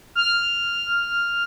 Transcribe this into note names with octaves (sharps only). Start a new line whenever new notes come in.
F6